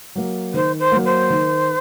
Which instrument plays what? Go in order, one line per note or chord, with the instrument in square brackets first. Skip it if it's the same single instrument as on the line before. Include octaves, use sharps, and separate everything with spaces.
[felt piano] F#3 A#3
[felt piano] D#3 [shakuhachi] C5
[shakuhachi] C5
[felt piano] F#3 A#3
[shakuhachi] C5
[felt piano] D#3